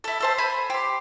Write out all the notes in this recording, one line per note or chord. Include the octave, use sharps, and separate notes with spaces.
E4 A4
A4 C5 A5
C5 G#5 B5
G4 C6